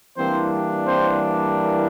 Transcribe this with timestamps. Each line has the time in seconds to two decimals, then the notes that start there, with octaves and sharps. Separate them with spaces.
0.17 E3 G3 A#3 C4 D4 C5
0.86 C4 C5